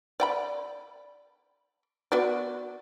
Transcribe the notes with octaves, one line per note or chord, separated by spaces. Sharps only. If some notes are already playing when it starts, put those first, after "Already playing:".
D5 G5 B5
B3 F#4 D5